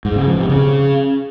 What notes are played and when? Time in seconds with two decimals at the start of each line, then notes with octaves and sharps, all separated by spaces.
0.05 G#2
0.16 C#3
0.27 F3
0.38 C3
0.49 C#3